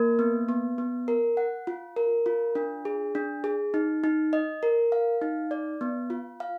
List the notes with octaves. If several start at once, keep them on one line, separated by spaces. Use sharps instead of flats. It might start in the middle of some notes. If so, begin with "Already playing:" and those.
Already playing: A#3 A#4
B3
B3
B3
A#4
F#5
F4
A#4
F4
D4
G#4
D4
G#4
D#4
D#4
D#5
A#4
F5
D#4
D5
B3
F4
F5